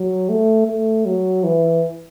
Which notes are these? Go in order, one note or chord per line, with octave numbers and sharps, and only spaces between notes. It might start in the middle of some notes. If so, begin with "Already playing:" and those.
Already playing: F#3
A3
A3
F#3
E3